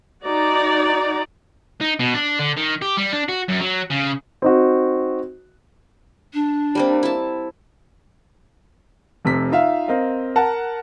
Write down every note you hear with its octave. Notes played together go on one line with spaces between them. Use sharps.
D#4 F#4 D5 A#5
D#4
B2
D4
D3
D#3
G4
G3
D4
F#4
F#2
F#3
C#3
C4 D#4 F#4
D4
G3 A#3 C4
E4 A5
F1 C3 B6
D#4 F4 E5 F5
C4 A#4 D#5 F5
A#4 F#5 A5